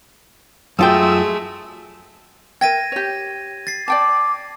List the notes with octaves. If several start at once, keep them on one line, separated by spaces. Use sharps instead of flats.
F#2 G#3 A3 F4 E5 G5 D#6 E6
A#4 E5 G5 G#6 A#6 D#7
G4 C#5
A6 C7
D5 G5 A5 D6